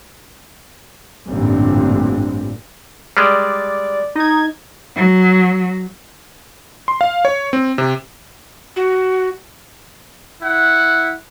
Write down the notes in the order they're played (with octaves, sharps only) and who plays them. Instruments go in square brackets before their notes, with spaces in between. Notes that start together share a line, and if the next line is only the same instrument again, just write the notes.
[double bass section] A1 G2 A#2 D3 C4
[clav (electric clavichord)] G3 G#3 [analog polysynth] D5
[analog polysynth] D#4 G#6
[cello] F#3
[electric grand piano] C6
F5
C#5
C4
C3
[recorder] F#4
[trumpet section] E4 F#5